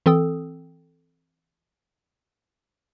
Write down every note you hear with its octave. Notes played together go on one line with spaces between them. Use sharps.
E3 C4 A4 G5 D#6 E6